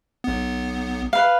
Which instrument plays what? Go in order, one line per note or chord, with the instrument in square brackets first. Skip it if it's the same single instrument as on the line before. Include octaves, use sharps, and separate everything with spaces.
[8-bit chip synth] B1 B3
[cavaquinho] B4 F5